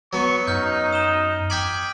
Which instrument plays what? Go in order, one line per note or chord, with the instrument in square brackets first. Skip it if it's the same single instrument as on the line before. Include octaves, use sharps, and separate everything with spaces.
[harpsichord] F#3 B3 [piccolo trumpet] C#6
[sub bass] F#2 [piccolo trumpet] D#4 [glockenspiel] F6 G6
[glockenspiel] D#6 E7 G7
[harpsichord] G5 G#5 D6 [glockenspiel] B6 F#7